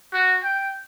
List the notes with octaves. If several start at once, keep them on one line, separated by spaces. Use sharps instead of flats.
F#4
G5